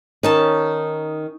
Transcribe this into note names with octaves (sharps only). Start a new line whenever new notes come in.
D#3 C#4 D#4 A5